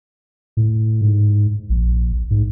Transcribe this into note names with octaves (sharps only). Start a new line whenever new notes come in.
A2
G#2
A#1
G#2